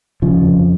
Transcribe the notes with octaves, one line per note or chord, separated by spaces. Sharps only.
C#3 F3
F2